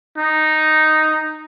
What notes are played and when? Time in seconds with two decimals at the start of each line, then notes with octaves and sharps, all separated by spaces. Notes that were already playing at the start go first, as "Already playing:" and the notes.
0.18 D#4